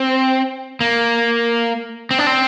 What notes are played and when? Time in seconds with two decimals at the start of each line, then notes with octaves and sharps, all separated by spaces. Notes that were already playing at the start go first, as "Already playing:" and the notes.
Already playing: C4
0.81 A#3
2.11 C4
2.19 D4
2.27 C4